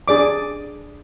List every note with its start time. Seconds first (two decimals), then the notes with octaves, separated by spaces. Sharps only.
0.08 D4 G#4 D5 D6